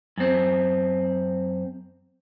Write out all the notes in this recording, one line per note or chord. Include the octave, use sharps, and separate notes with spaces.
F#2 C4